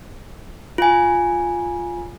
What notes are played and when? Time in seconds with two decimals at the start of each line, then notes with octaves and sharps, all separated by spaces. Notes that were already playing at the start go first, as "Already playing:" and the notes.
0.78 F4 G#5